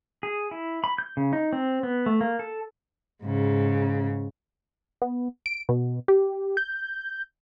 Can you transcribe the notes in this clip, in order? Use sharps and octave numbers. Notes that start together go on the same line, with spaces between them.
G#4
E4
B5
G6
C#3
D#4
C4
B3
A3
A#3
A4
G#2 C#3
B3
D7
B2
G4
G6